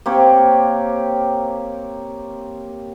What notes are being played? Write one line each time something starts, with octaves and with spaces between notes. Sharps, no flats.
A#3 C4 G4 C#5